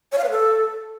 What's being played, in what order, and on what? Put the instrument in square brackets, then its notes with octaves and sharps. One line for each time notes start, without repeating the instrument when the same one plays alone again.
[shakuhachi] C#5
F5
B4
A4